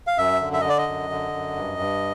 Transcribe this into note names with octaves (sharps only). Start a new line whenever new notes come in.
F5
F#2 E5
D3
E5
D3 D#5
D5
D#5
F#2
D3
F#2
G2
G2